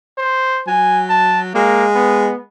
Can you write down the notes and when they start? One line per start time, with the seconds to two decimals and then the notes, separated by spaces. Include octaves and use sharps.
0.18 C5
0.67 F#3 G#5
1.09 A5
1.55 G#3 A#3
1.95 B3